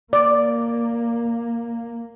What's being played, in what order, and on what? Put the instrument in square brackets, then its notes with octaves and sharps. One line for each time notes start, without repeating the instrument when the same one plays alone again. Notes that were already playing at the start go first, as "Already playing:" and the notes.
[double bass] A#3 [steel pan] D5